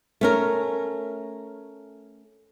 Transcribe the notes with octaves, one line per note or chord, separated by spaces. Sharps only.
A3 C#4 A#4